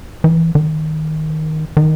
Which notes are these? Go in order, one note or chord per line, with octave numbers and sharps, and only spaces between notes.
E3
D#3
D#3